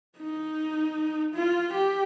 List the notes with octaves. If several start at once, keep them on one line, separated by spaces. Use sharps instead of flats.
D#4
F4
G4